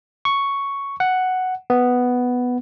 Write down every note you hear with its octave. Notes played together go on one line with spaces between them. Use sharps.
C#6
F#5
B3